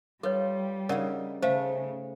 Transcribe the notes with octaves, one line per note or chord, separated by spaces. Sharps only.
G3 F4 A4 B4 C#5
C#3 D#4 A#4 D5 F#5
C#3 A3 C5 F5